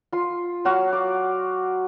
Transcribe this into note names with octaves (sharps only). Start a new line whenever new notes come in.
F4 C6
F#3 F#4 F5
D5 D6